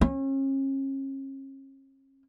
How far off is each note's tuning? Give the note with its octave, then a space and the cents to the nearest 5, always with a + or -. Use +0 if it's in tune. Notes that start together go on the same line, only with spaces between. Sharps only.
C#4 -40